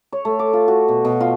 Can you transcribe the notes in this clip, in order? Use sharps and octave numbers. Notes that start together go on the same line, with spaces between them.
C#5
A3
D6
F4
F#4
B2
B2
F4